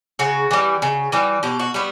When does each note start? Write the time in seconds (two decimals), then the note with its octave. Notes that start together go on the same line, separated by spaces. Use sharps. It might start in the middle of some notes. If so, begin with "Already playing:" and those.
0.19 C#3 F#4
0.51 E3 G3
0.82 C#3
1.12 E3 G3
1.43 B2 G4
1.59 F#4
1.74 G3 B3 F#4